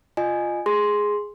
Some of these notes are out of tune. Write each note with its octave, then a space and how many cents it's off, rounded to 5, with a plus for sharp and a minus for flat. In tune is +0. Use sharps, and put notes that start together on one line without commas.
F4 +0 D#5 -25 G#5 +0
G#4 +0 C6 +0